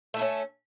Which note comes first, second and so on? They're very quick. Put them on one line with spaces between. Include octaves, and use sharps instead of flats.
A3 E4 A4 C#4